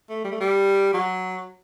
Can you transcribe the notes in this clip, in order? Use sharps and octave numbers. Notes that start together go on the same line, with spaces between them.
A3
G3
A3
G3
F#3